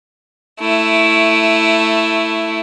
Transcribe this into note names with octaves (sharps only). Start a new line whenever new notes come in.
A3 E4